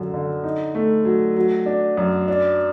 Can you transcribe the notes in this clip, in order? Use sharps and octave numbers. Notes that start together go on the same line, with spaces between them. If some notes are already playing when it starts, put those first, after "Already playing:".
Already playing: F#2 D3
D3
D#4
A3
F#3
F#3
D4
F#2
D4